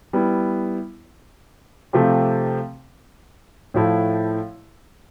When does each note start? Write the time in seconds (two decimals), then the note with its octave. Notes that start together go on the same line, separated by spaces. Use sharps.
0.13 G3 B3 E4
1.93 C3 F3 A3 C4 G4
3.74 A2 F3 A3 E4